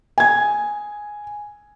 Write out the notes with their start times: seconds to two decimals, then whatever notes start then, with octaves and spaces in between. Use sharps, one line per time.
0.18 G#5 G#6